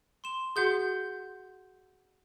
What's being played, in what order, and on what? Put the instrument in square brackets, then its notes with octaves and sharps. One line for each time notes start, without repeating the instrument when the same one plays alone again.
[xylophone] C6 E7
[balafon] F#4 G#4 [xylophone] F#5 G6 G7